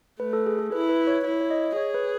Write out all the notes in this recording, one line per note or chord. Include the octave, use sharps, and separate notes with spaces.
A3 B4
A4
G#4
A4
E4 B4
B4
C#5
E4 C#5
C#5
D#5
G#4 C#5
B4